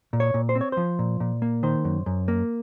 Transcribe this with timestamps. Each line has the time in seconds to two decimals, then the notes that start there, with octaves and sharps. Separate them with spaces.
0.13 A#2
0.20 C#5
0.34 A#2
0.49 C5
0.55 C4
0.61 C#5
0.72 F3 C5
0.99 A#2
1.20 A#2
1.42 A#3
1.63 D#3 C5
1.85 F#2
2.06 F#2
2.28 A#3